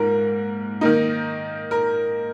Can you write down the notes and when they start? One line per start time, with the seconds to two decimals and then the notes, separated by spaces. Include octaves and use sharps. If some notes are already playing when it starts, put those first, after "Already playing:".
Already playing: G#2 A#3 F4 A#4
0.81 D#3 A#3 D#4
1.71 A#4